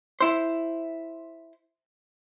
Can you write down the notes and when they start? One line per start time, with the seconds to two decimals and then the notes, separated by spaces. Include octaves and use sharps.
0.21 E4 C5